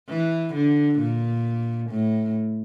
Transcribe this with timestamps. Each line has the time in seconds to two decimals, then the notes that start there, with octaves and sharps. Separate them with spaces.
0.09 E3
0.54 D3
0.99 A#2
1.90 A2